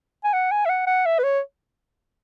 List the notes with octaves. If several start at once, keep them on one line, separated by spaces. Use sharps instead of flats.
G#5
F#5
G#5
E5
F#5
F#5
E5
B4
C#5